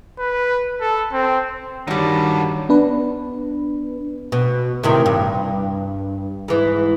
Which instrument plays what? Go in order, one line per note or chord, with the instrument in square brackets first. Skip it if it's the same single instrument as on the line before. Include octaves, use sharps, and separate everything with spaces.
[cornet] B4
A4
C4
[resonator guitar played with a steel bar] G2 G3 [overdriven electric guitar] D3 D#4 [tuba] D#3 [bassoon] F#3
[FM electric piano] B3 D4 B4
[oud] B2
A2 C3 D#3
G2
G#2 E3